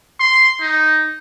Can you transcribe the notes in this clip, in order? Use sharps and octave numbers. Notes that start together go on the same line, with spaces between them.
C6
D#4